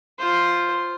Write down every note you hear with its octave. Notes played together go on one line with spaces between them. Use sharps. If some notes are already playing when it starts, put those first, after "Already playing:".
F4 C5